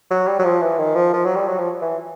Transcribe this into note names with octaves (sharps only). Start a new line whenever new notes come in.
F#3
G3
F#3
F3
E3
D#3
F3
F3
F#3
G3
F#3
F3
E3